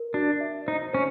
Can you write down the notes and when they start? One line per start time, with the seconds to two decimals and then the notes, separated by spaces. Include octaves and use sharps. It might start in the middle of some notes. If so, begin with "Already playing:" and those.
Already playing: A#4
0.14 D4 F#4
0.41 E5
0.67 D#4 C5
0.93 C#4 C5